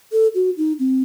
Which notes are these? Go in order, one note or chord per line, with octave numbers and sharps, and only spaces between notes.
A4
F#4
D#4
C4